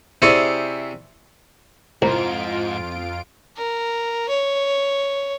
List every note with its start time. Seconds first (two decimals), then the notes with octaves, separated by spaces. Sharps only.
0.22 C3 E4 G#4 C5 D5 C#6
2.02 C2 F2 G#2 E4 F4 C5 A#5 D7
3.57 A#4
4.29 C#5